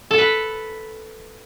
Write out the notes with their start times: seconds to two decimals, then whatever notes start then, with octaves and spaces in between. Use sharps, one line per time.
0.11 A4
0.18 B4